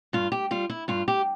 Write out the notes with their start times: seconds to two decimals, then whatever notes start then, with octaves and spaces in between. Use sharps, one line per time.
0.13 G2 F4
0.32 G4
0.51 G3 F4
0.70 E4
0.88 G2 F4
1.08 G4